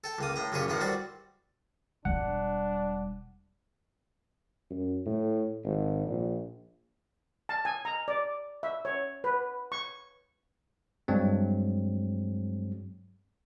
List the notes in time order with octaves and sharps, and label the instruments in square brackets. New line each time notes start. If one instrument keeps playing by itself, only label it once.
[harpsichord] A4 G5
C#2 A#3 D#6
A2 G5 A#5
F#2 A#2 C#3 G4 G#4 C#5
E2 A2 D#3 A#4 F#5
G3 C4 F#4 D5
[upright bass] E1 G3 [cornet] D4 [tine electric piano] F#5
[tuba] F#2
A2
G#1
A#1
[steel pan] A5
G#5
A#5
D5
E5
C#5
B4
C#6
[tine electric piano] G2 F#3 G#3 C4